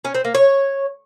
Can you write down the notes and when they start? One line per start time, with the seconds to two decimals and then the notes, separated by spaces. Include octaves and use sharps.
0.05 C#4
0.15 C4
0.25 A#3
0.35 C#5